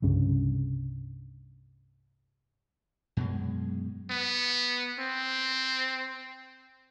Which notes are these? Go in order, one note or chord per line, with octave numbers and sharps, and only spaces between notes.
C2 G2 C#3
F#2 B2 G#3
B3
C4